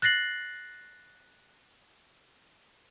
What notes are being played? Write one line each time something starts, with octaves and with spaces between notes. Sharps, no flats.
F#6 A6 A#6 C7 F#7